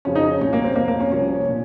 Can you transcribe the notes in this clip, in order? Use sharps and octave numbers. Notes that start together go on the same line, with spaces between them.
F2 C#3 F3 C#4
D#4
C#4
C2 A#2 G3 C#4
A#3
C4
F2 C3 F3 A#3
A#3
C#4
C2 C3 F3 C#4
A#2